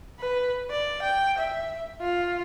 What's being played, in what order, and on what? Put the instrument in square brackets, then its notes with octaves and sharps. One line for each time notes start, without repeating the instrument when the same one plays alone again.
[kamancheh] B4
D5
G5
E5
F4